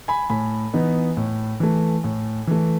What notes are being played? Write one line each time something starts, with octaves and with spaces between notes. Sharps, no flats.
G#5 B5
A2 G#5 B5
E3 B3 D#4
A2
E3 A3
A2
E3 A3